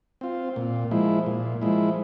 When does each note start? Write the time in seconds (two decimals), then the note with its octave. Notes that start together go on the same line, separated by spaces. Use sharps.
0.21 C4 F4
0.56 A#2
0.91 F3 G#3 E4
1.26 A#2
1.62 F3 G#3 E4